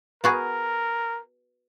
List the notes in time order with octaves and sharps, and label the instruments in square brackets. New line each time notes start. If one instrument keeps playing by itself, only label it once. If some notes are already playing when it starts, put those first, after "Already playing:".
[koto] B3 F#4 G#4 [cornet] A#4